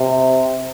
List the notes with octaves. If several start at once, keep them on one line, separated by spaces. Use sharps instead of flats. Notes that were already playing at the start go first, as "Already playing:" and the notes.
Already playing: C3